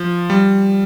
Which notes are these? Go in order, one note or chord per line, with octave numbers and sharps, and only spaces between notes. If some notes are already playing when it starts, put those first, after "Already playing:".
Already playing: F3
G3